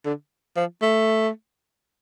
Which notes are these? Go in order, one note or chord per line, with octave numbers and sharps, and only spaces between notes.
D3
F3
A3